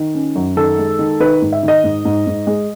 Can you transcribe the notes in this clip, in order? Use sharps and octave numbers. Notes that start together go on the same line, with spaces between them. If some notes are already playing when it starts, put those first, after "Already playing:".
Already playing: D#3
C#4
F#2
D#3 A4
G#3
D#3
D#3 B4
G#2
E5
D#3
D#5
G#2
G#2
G#2
G#3